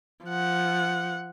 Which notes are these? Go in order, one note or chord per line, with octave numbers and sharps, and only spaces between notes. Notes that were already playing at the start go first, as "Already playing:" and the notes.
F3 F#5